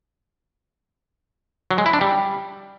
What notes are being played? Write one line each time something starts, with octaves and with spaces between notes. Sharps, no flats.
F#3
G#3
E4
D4
G3